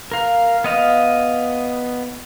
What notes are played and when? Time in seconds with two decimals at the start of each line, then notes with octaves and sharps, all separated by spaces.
0.12 A#4 F5
0.64 B3 D#5 F5